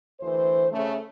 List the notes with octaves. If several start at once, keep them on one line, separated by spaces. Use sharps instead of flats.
D2 E3 C5
C#3 A3